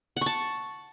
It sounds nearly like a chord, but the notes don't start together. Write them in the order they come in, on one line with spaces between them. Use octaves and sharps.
F#5 C#6 A5